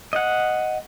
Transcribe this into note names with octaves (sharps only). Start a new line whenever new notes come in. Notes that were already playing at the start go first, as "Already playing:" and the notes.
D#5 F#5